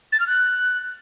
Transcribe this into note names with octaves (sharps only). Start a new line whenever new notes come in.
A6
F6
F#6